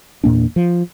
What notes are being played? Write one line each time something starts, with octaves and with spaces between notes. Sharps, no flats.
E2 A#2 A#3 D4
F3